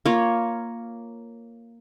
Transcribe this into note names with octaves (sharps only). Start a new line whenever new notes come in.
A#3 F4 C#5